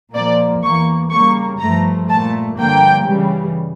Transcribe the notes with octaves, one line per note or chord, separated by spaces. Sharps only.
A#2 F3 A#3 D5
E2 E3 A#3 C#6
C#3 G3 A#3 C#6
G2 F3 A3 A#5
A#2 A3 A5
G2 D3 F3 A#3 G5
C#3 E3 G3